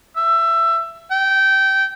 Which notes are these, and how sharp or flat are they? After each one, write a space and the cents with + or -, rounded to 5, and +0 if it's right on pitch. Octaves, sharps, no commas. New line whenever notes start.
E5 +20
G5 -20